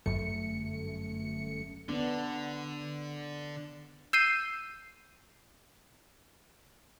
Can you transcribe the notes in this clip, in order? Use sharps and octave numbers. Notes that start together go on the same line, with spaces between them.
G1 F#2 A3 C#7
D3 B3 D4
E6 G6 C7 D#7